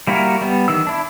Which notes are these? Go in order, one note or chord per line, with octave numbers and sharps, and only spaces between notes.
G3 A#3 E4 F#4 A#4
G3 B3
D#3 E3 E6
D4 E4